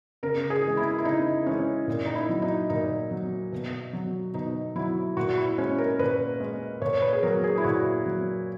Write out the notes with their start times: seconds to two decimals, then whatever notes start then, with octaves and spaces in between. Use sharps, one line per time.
0.23 C#3 A#4
0.50 G#4
0.63 E3 G#3
0.77 E4
0.98 E4
1.05 C#3 D#4
1.46 E3 G#3 C#4
1.87 A#2
2.06 D#4
2.15 E4
2.29 F#3
2.42 D#4
2.70 A#2 D#4
3.11 F#3
3.52 B2
3.93 F#3
4.34 B2 D#4
4.76 F#3 E4
5.16 A#2 F#4
5.37 E4
5.58 G#3 C#4
5.78 A#4
5.99 A#2 B4
6.40 G#3
6.81 A#2 C#5
7.02 B4
7.13 G#4
7.23 F#3 A#4
7.44 G#4
7.58 E4
7.64 A#2 F#4
8.05 F#3